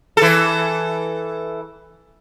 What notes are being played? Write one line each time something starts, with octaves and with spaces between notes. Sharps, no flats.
E3 A4